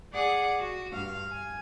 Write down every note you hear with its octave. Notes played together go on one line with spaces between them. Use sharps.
G#4 D5 F#5 D6
F#4
G2 F5
G#5